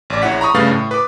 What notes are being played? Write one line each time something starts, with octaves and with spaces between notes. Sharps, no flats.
A1 D5
A#1 E4 C#5 F#5 B6
A#5 B5 C#6 D#6
G2 C#3 A3 B4 F5 A6
A2
B4 D6